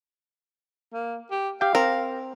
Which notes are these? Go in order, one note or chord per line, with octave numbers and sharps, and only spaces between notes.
A#3
G4
G4 F5 G5
C4 A#4